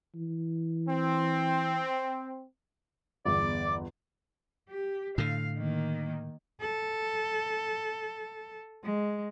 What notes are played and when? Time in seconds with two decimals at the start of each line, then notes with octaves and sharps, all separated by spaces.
0.15 E3
0.88 C4
3.26 G1 E2 D5 D6
4.69 G4
5.18 A2 D3 F5
5.57 D#3 A#3
6.61 A4
8.83 G#3